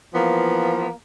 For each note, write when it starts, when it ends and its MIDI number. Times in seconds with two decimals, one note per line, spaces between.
0.15 0.90 52
0.15 0.90 53
0.15 0.90 58
0.15 0.90 59